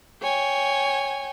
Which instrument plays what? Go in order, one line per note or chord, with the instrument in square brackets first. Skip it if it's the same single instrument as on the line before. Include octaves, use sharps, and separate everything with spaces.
[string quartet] C#5 G5 G#5